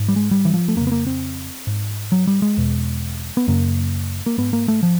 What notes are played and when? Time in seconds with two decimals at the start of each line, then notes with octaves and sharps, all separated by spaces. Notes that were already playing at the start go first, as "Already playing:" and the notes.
Already playing: G#2
0.08 G3
0.16 G#3
0.31 G3
0.45 E3
0.54 F3
0.68 A3
0.76 F2 C#3 A#3
0.87 B3
0.92 A#3
1.07 C4
1.67 G#2
2.12 F#3
2.27 G3
2.42 G#3
2.57 E2 B2
3.37 B3
3.48 F#2 C#3 A#3
4.26 A#3
4.38 G#2 B3
4.53 A#3
4.68 A3
4.83 F3